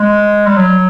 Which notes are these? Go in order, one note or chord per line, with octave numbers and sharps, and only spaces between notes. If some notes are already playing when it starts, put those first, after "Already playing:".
Already playing: G#3
G3
F#3